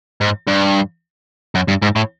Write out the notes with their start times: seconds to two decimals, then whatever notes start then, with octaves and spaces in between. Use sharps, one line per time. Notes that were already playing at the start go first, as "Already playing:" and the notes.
0.21 G#2
0.47 G2
1.55 F#2
1.68 G2
1.82 G#2
1.96 A2